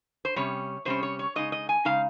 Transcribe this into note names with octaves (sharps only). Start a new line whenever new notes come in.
C5
C3 G3 C#4 C#5
C3 G3 C#4 C5
C#5
C#5
C#3 G#3 D#4 D#5
D#5
G#5
C#3 G#3 D#4 F5